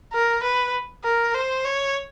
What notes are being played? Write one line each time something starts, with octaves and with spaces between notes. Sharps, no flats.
A#4
B4
A#4
C5
C#5